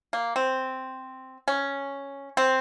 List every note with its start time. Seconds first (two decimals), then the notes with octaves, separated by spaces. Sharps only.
0.13 A#3
0.36 C4
1.48 C#4
2.37 C4